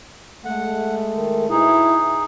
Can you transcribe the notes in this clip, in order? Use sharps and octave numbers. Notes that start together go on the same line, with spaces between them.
G#3 A3 F#5
D#3
B2 D#4 E4 G#4